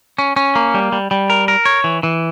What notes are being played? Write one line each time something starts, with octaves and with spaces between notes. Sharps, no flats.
C#4
C#4
A#3
G3
G3
G3
A#4
A#4
C#5
E3
E3